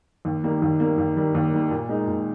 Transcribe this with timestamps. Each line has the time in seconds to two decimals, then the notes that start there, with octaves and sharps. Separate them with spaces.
0.25 D#2
0.44 D#3 G3 A#3
0.62 D#2
0.80 D#3 G3 A#3
0.98 D#2
1.17 D#3 G3 A#3
1.35 D#2
1.53 D#3 G3 A#3
1.71 A#2
1.89 G#3 D#4 A#4
2.08 A#2